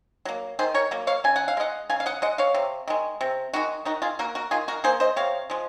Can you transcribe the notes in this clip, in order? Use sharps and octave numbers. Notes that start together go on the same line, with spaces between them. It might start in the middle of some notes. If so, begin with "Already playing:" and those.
F#3 A#3
D#3 G#4 C5
A#4 C#5
F#3 A#3
C#5 F5
C#3 G#5
F#5
F5
G#3 D#5 F#5
C#3 F5 G#5
F5
D#5 F#5
G#3 D#5 F#5
C#5 F5
C3
D#3 G#3
C3
D#3 G#3 D#4 F#4
D#3 D#4 F#4
F4 G#4
A#3 F#4 A#4
F#4 A#4
D#3 F4 G#4
F#4 A#4
A#3 G#4 C5
C5 D#5
C3 C#5 F5
F3 G#3